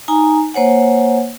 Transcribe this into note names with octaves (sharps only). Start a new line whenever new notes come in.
D#4 G#5 A#5
A#3 C5 C#5 F#5 G#5